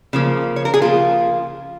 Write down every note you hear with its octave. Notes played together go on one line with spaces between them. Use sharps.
C#3 F3 A#3
C#5
A#4
G#4
C#3 F3 A#3 F4